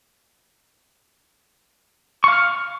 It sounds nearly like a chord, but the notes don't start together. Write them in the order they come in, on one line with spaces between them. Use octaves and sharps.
C#6 F5 F6